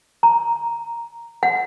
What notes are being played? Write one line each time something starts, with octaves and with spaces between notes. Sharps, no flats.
A#5
F#5